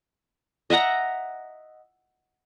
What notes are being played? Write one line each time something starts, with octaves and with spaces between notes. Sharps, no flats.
D#5 E5 F#5 A#5